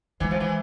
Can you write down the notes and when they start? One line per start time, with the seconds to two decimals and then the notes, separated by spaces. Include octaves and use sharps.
0.20 E3 G#3
0.31 F3
0.40 E3